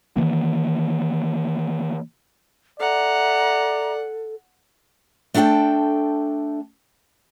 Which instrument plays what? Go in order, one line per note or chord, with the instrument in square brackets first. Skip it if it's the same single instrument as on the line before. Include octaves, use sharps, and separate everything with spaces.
[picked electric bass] D#3 E3 A#3
[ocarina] A4 [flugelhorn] D5 [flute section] E5 A#5 [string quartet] F#5
[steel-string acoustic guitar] A3 D4 A4 E5 G5 A5